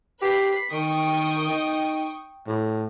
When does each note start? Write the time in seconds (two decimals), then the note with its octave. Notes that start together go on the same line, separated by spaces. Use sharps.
0.22 G4 B4 B6 C7
0.72 D#3 G5 C#6 D#6
1.50 D#4
2.47 A2